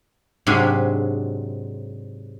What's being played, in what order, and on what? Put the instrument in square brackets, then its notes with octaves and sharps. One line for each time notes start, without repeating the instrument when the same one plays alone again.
[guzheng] G#2 C3 F#3 D4 G4 G#4